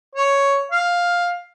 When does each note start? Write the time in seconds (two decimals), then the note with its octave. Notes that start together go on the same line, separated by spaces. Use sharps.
0.15 C#5
0.72 F5